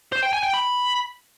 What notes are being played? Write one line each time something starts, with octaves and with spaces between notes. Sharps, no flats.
C5
G5
G#5
G5
B5